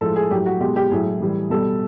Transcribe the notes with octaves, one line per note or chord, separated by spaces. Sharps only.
A2 F3 G#3 A4
G#4
A2 F#3 G4
F#4
B2 G#3 G4
G4
A2 F#3 G#4
A2 E3 G3
B2 G3 A4